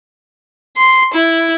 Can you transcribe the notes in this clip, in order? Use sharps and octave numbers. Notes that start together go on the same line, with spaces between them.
C6
E4